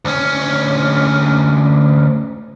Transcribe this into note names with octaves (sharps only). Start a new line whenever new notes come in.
D2 C#4